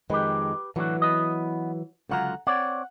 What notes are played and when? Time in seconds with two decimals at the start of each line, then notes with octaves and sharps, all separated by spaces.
0.10 F2 D#3 G#3 G4 B4
0.76 A2 D3 E3 F#3 F#4
1.02 B3 D#5
2.10 C#2 D3 F#3 F4 F#5 A#5
2.47 C4 C#5 D5 F#5